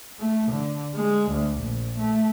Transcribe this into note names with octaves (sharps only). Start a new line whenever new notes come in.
A3
D3
G#3
D2
A#1
A3